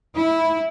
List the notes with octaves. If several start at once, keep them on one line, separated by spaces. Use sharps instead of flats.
E4